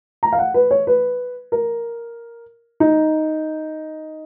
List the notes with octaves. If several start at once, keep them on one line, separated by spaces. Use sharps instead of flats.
A#5
F5
F#5
B4
C#5
B4
A#4
D#4